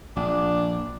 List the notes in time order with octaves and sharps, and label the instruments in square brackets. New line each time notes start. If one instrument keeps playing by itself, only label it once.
[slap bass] A#1 [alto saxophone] D4